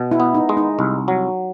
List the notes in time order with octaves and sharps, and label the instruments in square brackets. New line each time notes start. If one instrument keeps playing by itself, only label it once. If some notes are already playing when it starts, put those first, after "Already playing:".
Already playing: [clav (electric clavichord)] B2
[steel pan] E4
[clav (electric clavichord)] B3
[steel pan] D#4
[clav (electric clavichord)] G#3
[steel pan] D#4
[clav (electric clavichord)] C2
F#3